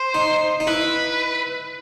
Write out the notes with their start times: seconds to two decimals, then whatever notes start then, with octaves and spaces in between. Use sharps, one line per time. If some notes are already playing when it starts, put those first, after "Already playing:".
Already playing: C5
0.14 D#4
0.60 D#4
0.67 E4 B4